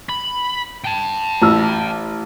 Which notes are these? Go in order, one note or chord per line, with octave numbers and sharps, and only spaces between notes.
B5
G5 A5
A1 E6